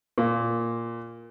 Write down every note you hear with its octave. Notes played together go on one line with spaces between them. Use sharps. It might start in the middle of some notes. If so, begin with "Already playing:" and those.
A#2